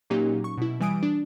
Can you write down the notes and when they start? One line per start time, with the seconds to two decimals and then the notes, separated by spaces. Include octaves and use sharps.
0.10 A#2 F#3 A#3 C#4 D#4 G4
0.44 C#6
0.58 B2 E4
0.80 E3 G3 G#5 D#6 D7
1.03 D4